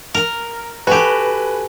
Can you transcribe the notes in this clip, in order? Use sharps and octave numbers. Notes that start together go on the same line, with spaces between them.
A#4
F#4 G4 A4 B4 G#5